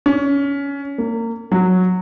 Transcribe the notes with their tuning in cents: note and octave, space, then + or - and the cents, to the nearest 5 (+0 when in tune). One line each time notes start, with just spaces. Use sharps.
C#4 +20
A#3 -30
F#3 -10